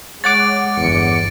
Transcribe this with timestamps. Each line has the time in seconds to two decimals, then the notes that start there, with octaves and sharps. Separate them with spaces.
0.24 G#3 C#5 F#5 D6 A6 D7
0.78 G1 E2 C#7